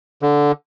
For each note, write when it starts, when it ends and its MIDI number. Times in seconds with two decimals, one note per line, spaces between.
0.22 0.52 50